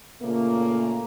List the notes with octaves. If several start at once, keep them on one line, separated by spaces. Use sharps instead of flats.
A#2 C#3 A3 A#3